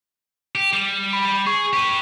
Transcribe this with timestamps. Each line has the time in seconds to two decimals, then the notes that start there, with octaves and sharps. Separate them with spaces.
0.55 G4
0.73 G3
1.13 B5
1.46 G#4 C#6
1.73 G4 B4